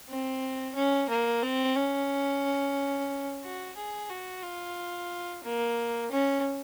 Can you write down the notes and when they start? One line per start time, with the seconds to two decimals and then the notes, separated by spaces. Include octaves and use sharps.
0.09 C4
0.75 C#4
1.09 A#3
1.42 C4
1.75 C#4
3.43 F#4
3.76 G#4
4.09 F#4
4.42 F4
5.43 A#3
6.11 C#4